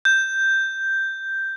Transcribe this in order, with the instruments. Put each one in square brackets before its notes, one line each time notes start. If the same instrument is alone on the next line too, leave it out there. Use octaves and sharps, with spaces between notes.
[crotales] G6